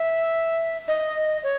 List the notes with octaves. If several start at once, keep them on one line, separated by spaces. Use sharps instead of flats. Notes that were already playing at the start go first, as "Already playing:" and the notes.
Already playing: E5
D#5
C#5